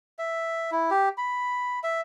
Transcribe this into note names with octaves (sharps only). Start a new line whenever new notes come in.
E5
E4
G4
B5
E5